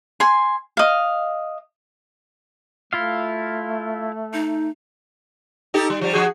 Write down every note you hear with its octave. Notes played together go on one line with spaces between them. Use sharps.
G#5 C6
D#5 F5
A3 E4 F4 F5
D#4
D#4 G4 A4
G3
F3 G3
F3 F#4 G#4